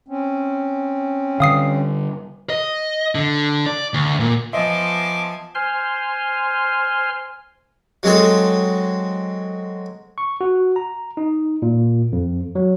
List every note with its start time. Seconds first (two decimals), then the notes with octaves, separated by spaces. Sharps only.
0.08 C4 C#4
1.40 D3 G3 F5 D#6 C7
2.50 D#5
3.15 D3
3.66 D5
3.94 D2
4.20 A#2
4.53 F3 B3 D#5 E5 G#5 A5 C6 D6
5.55 C5 G#5 C6 F6
8.03 F#3 G#3 C4 G#4 A4
10.18 C#6
10.41 F#4
10.76 A#5
11.17 D#4
11.62 A#2
12.12 F2
12.55 F#3